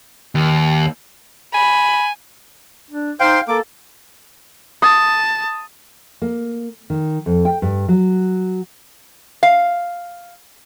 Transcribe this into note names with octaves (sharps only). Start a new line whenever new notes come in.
D#2
G#5 B5
D4
D#4 C5 F5 G5 C6
A#3 A4 D6
A5 D#6
A#3
D#3
F2
G5
G2
F#3
F5